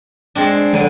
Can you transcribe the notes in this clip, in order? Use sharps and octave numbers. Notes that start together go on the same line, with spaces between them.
G#3 C4 D4
D3 F3 D#7